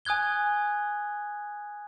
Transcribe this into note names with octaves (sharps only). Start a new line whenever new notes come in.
G#5 D#6 F#6 G#6 G7